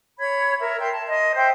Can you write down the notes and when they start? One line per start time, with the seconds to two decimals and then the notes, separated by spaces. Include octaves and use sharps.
0.19 C#5 B5 G#6
0.58 A#4 E5
0.79 E5 G5 C6
0.91 A5
1.08 D#5 C6
1.35 C5 E5 G5